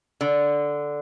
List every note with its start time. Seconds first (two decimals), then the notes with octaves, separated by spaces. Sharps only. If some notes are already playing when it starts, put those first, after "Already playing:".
0.21 D3